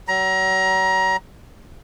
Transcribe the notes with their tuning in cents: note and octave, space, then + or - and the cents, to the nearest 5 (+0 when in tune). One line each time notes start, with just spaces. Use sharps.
F#3 +40 A#5 +25